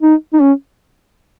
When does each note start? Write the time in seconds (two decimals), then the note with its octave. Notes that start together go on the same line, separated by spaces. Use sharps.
0.03 D#4
0.34 D#4
0.41 C#4